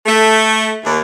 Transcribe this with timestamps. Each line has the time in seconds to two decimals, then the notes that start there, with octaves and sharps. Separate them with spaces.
0.06 A3
0.84 D#2